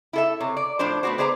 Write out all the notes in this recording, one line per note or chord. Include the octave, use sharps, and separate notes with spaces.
E4 A4 E5
C3 C#5
D5
A2 F3 D4 C5
A3 B3 D4 F#4 C5
B3 G#4 C5 D5 E5 A#5